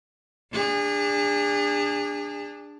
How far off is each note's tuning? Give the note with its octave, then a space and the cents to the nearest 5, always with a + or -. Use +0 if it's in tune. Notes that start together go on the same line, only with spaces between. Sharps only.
D4 +0 G#4 -35